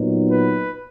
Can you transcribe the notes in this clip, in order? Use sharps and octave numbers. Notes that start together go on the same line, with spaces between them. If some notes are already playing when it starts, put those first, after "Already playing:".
Already playing: A#2 F#3 B3 D#4
B4